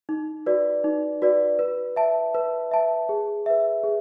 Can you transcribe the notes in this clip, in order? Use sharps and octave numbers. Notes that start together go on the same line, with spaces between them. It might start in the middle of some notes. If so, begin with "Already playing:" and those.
D#4
F#4 B4 D5
D#4
F#4 B4 D5
B4
E5 A5
B4
E5 A5
G#4
B4 E5
G#4